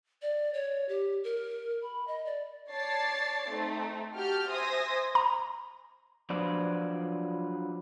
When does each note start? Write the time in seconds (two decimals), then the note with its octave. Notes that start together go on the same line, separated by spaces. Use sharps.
0.22 D5
0.54 C#5
0.89 G4
1.24 A#4
1.82 B5
2.08 D#5
2.26 D5
2.72 C#5 D5 A5 D6 A6 C7
3.50 A3 C4 D#4
4.15 F#4 G4 A5 F6 G6
4.48 C5 E5 G#5 D#6 A#6
5.15 A#5
6.30 F3 F#3 D4 B4 C5 D5